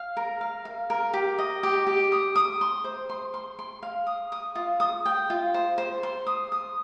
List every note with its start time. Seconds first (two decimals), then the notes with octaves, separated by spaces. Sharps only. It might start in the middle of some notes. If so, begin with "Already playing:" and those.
Already playing: F5
0.17 A#4
0.41 F5
0.65 F5
0.90 A#4
1.14 G4
1.38 D#5
1.63 G4
1.87 G4
2.12 D#6
2.36 D#6
2.61 C6
2.84 C5
3.10 C6
3.34 C6
3.59 C6
3.83 F5
4.07 D#6
4.32 D#6
4.55 F4
4.80 D#6
5.06 G5
5.30 F4
5.54 C5
5.78 C5
6.03 C6
6.27 D#6
6.52 D#6